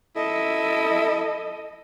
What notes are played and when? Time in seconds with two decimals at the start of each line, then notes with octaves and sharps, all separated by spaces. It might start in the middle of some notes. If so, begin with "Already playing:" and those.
0.16 E4 A4 D#5